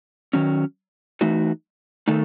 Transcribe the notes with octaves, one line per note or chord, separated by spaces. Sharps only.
D#3 F#3 C#4
E3 A3 D#4 F#4
D#3 A3 D#4 A4